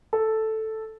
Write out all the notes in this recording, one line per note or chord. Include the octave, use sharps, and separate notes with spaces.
A4